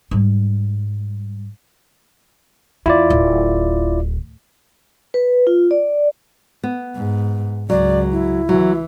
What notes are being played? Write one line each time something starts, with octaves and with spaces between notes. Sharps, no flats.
G#2 G3
E2 E4 F4 D5
D1
B4
F4
D5
B3
G#2
C#2 F#3 D5
E4
E3 F#3